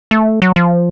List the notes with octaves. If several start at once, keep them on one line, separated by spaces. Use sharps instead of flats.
A3
F#3
F3